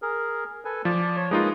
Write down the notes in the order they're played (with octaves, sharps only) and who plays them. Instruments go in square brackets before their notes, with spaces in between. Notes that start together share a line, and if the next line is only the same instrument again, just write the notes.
[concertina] G#4 A#4
A4 B4 G#5
[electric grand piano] F3 [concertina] D5 A5
[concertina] C#5
[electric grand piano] G#3 D#4 F4 [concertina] A#3 B4 D#6